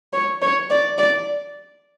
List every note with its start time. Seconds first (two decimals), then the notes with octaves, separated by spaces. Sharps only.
0.13 C#5
0.42 C#5
0.70 D5
0.98 D5